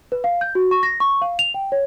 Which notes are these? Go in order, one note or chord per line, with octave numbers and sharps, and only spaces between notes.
B4
F5
G6
F#4
C#6
A#6
C#6
F5
F7
G5
C#5